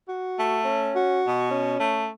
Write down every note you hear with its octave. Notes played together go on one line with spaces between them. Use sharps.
F#4
A3
C#4
F#4
B2
C#4
A3